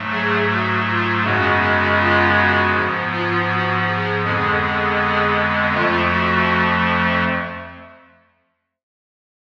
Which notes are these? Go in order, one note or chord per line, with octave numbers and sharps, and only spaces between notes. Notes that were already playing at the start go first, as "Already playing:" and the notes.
Already playing: G#2 F#3 A3
G#4
F#4
F4
F#2 C#3 G#3 B3 F#4
F#4
F4
F#4
G#2 F3 B3
F4
F#4
G#4
F2 D3 G#3 B3 G#4
G#4
G#4
F2 F3 A3 F4
F#4